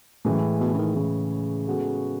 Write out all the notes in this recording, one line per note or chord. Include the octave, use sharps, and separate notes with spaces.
F#2 A2 E3 G#3
B2
C#3
D#3
A2 C#3 E3 G#3
G#3 B3 F#4 A4